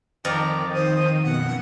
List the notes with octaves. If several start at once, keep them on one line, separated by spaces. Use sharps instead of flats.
F2 D#3 D5 A#5
C5 D#6
F#2 B2 F#5